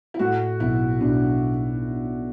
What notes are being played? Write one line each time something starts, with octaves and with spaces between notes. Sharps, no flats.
E4
A2 F#4
B1 E4
B1 D4